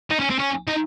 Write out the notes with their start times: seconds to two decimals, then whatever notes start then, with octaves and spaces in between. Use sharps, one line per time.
0.11 D#4
0.20 C#4
0.30 C4
0.39 C#4
0.67 D#4